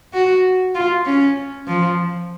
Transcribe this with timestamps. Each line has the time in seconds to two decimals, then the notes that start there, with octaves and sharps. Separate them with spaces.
0.13 F#4
0.75 F4
1.06 C#4
1.67 F3